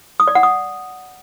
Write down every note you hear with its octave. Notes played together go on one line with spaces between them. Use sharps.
D#6
D5
F#5
D#6